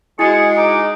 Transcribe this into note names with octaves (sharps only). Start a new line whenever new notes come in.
G#3 E4 F#4 G#4 C#6
D#4 D6